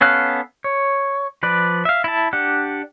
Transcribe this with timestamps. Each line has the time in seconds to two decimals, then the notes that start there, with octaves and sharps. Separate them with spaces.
0.01 B3 C#4 A4 F5 F#6
0.64 C#5
1.43 F3 B4 D5
1.85 E5 F5
2.04 E4 A5
2.33 D4 G4 F#5